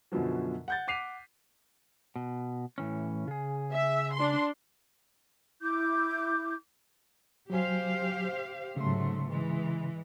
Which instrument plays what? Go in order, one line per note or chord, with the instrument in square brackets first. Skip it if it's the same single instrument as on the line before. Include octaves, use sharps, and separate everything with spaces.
[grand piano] F#2 B2 D3 F3 F#3
F#5 G6 A6
F#5 D6 B6 C7 D#7 F7
[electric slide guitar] B2
A2 E3 C#4
C#3 G#4
[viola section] E5
D4 C6
[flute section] E4 D6 G6
[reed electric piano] F#3 G#5 [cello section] G4 C5 F5
[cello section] G#2 F#3 A3 [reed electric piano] C#3 C6
[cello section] E3 G#3